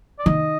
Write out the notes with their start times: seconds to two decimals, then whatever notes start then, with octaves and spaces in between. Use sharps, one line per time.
0.19 D5
0.26 D#3 D#5